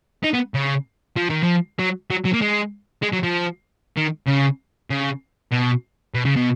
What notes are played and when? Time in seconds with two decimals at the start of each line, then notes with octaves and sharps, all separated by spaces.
0.24 D#4
0.34 B3
0.55 C#3
1.16 F3
1.30 D#3
1.43 F3
1.79 F#3
2.11 F#3
2.25 F#3
2.33 A#3
2.41 G#3
3.03 G#3
3.13 F#3
3.24 F3
3.97 D#3
4.28 C#3
4.90 C#3
5.52 B2
6.15 B2
6.25 C#3
6.36 B2